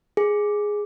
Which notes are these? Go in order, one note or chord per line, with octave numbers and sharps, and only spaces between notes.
G#4